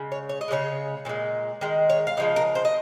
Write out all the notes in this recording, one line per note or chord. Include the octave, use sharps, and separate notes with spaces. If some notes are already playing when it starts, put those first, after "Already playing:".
Already playing: C#3 G#3
C#5
C#5
D#5
C#3 F3 G#3 C#5
A#2 F3 G#3
D#3 G#3
C#5
F5
C#3 F3 G#3 D#5
A#4
C5
D#5